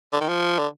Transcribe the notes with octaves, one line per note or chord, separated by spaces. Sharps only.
D3
D#3
F3
D3